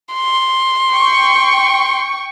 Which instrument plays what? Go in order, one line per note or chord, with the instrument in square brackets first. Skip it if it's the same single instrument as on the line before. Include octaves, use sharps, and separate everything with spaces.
[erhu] C6
[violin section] G5 C#6